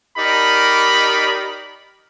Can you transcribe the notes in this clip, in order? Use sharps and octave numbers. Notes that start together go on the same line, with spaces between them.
D#4 G4 A#4 D5 B5